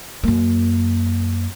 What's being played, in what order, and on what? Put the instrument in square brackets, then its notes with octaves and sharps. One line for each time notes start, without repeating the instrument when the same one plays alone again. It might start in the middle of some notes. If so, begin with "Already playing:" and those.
[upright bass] F#2 A#3